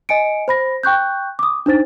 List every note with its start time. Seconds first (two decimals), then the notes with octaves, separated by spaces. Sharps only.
0.09 D#5 G#5 C#7 D7
0.48 C5 B5 A#6
0.83 G5 C#6 F#6 G6
1.39 D6 D#6
1.66 D4 D#4 C5 A6